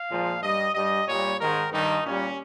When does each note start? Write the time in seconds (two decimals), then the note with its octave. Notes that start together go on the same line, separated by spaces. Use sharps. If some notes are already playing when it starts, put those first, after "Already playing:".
Already playing: F5
0.09 A#2 F3 G#3
0.42 G2 G3 D#5
0.74 G2 G3 D#5
1.06 A#2 G3 C#5
1.39 G#2 D#3 G#3 A#4
1.71 G2 D#3 G3 D#4
2.05 A#2 G3 C#4